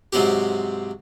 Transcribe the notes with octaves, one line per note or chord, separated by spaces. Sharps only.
G#2 C3 F#3 C4 G4